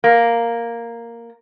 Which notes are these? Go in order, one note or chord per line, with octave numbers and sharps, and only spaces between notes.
A#3